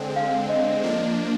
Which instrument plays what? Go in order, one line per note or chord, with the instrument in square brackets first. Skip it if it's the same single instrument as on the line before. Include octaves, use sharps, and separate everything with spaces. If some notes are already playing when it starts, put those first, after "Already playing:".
Already playing: [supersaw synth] D3 G#3 C4
[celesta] F5
D#5
[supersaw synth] F3 A#3 D4